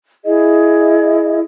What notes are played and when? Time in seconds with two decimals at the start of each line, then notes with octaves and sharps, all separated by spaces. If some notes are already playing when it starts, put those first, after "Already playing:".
0.25 E4 G#4 D#5